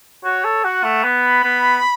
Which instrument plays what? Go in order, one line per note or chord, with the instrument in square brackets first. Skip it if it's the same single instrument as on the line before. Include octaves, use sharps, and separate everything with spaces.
[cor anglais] F#4 [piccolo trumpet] C#5
[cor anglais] A4
[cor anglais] F#4 [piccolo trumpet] F#5
[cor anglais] A3
[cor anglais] B3 [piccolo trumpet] B5
[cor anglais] B3